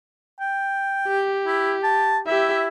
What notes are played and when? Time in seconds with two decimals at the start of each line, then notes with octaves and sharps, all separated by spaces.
0.40 G5
1.08 G4
1.47 E4
1.84 A5
2.27 E4 G4 E5